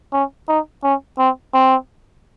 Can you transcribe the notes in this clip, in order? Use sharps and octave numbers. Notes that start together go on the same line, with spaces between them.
C#4
D#4
C#4
C4
C4